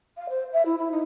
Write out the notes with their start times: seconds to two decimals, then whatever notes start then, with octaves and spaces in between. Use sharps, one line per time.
0.17 F5
0.29 C5
0.52 E5
0.65 E4
0.78 E4
0.91 D#4